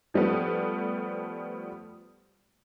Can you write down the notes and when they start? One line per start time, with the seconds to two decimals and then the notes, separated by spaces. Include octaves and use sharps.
0.14 F3 G3 A3 B3